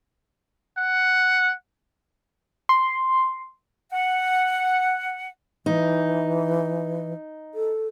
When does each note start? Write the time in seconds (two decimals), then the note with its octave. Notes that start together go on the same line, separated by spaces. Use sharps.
0.78 F#5
2.69 C6
3.92 F#5
5.66 E3 D#4
7.54 A4